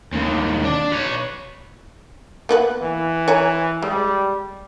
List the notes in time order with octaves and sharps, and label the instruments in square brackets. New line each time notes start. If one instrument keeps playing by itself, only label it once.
[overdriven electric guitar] D#2 C#3
D4
B4 C#5
[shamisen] A#3 B3 B4
[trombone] E3
[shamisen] C#5 G#5 A#5
[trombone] G3 [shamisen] G#3